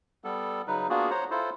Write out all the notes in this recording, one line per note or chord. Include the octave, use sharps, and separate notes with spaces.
G3 B3 A4
C#3 F#3 D#4 B4
A#3 B3 D4 F4 F#4 G#4
C5 C#5 F#5 A#5
E4 F4 A4 C5